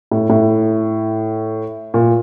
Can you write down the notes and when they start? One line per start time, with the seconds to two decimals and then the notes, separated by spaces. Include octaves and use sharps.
0.11 A2
0.30 A2
1.94 A#2